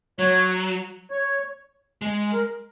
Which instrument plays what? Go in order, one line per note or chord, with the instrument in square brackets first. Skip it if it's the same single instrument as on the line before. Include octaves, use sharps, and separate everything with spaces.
[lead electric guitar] F#3 [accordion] C#5
[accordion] C#5
[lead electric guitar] G#3
[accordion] A#4